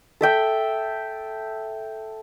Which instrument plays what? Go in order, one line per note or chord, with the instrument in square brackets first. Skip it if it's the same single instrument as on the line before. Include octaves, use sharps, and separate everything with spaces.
[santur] A4 E5 G5